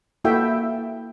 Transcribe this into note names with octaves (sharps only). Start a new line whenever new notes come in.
A#3 E4 F#4 A4 E5 G5